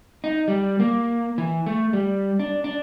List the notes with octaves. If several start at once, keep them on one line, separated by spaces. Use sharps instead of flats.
D#4
G3
A#3
E3
A3
G3
D4
D4